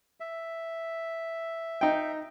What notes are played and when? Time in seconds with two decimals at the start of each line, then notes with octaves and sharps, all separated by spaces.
0.20 E5
1.81 D#4 G5